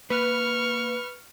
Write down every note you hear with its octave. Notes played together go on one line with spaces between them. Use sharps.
A#3 B4 C#6 F6